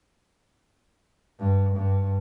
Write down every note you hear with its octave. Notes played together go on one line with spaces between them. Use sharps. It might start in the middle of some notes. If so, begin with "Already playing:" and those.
G2
G2